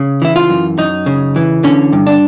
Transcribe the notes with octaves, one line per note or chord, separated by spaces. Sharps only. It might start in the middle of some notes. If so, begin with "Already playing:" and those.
Already playing: C#3
E3 E4
F4
F#2
F#2 D#4
C#3
E3
D3 C#4
G2
D4